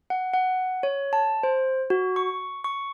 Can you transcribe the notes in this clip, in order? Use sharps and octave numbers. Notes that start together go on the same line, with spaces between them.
F#5
F#5
C#5
A5
C5
F#4
C#6
C#6